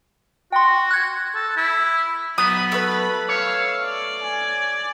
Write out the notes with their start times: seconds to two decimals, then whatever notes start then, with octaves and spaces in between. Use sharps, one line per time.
0.52 F#4 G5 C6
0.91 F#6 G#6
1.35 A4
1.57 E4
2.38 F#3 B3 B5 D#6
2.72 A3 B4
3.29 C#5 F5 E6
3.85 D5
4.22 G#5